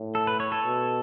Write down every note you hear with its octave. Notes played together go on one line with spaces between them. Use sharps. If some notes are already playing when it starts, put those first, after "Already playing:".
Already playing: A2
A4
B4
C#5
A4
B2